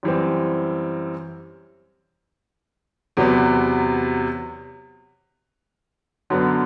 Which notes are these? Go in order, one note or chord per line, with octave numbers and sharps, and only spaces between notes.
F#2 E3 G3 C4
E2 C3 F#3 B3
F#2 D3 F#3 B3